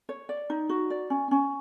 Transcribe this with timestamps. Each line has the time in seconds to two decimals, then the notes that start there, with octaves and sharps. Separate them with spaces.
0.09 C#5
0.29 D5
0.50 D#4
0.69 F#4
0.90 D5
1.10 C#4
1.31 C#4